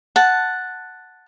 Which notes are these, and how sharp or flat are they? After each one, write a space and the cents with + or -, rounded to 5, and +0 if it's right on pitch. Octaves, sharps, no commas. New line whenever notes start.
F#5 +0 A5 +0